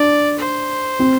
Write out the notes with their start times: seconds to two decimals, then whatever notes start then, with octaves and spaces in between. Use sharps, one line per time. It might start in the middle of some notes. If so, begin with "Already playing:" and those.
Already playing: D4 D5
0.40 C5
0.99 C4